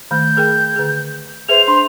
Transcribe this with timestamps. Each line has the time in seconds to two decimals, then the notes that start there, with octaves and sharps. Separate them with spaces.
0.11 D#3 A3 G6
0.37 G#4 A#4 G5
0.76 D3 G#4
1.49 G#4 B4 C5 E5 F7
1.68 D4 C6